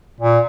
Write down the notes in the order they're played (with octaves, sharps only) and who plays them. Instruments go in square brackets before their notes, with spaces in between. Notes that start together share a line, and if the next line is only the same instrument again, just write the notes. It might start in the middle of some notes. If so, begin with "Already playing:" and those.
[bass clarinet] A#2